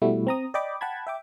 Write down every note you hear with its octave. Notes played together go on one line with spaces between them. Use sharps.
B2 G3 A3 E4 F#4
C4 A#5 D#6
D5 D#5 G5 B5 D6
F#5 G5 A5 B5 G#6
E5 G5 D6